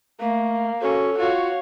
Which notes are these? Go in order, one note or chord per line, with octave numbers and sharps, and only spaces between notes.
A3 A#3
C#4 F#4 A4
F4 F#4 C#5 F5